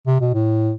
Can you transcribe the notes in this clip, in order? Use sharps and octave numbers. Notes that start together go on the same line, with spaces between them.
C3
B2
A2